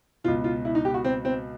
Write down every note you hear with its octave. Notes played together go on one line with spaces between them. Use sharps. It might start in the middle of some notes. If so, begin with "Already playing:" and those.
C#2 B2 F4
F4
E4
D#4
G4
F#4
C4
C4